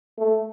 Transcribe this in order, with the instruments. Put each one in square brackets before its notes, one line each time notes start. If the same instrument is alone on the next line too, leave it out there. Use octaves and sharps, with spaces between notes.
[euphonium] A3